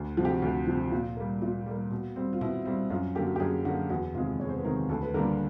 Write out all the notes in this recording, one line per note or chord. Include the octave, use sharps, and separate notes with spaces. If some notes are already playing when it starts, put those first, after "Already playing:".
Already playing: D2
C3 F3 F#4 G4
F#4
D2
C3 F3
A#2
G3 A#3
A#2 F4
G3 A#3
B2
G3 C4
F4
B2 E4
G3 C4
F#2 F4
D3 F#3 A#3 G4
G4
F#2 G#4
D3 F#3 A#3 F#4
E2 F#4
C3 D#3 G#3 F4
E2 C#5
C5
B4
C3 D#3 G#3 A#4
D2 A4
B4
D3 G3 A#3 D4 A#4